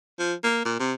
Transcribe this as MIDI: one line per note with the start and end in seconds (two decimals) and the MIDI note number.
0.19 0.34 53
0.43 0.64 58
0.65 0.78 46
0.80 0.93 48